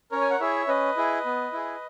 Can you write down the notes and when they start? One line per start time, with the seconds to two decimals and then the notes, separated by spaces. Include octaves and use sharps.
0.12 C#4 A#4 C#5
0.21 G#5
0.30 F#5
0.40 E4 G#4 C#5 E5
0.68 C#4 B4 D#5
0.97 E4 G#4
1.25 B3
1.53 E4 G#4